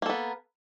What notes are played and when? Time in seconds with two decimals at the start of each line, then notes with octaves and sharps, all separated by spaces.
0.02 A#3
0.06 A4
0.09 B3